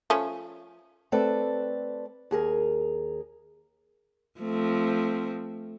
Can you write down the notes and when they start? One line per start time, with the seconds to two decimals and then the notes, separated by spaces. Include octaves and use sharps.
0.10 F3 A3 C#4
1.12 A3 C4 A4 B4 D5
2.31 D#2 G#4 A#4
4.40 F3 A3 C4